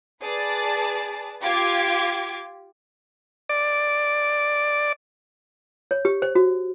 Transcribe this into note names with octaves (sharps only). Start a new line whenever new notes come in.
G#4 B4 D5 A5
F4 G4 D6 G#6
D5
C#5
G4
C5
F#4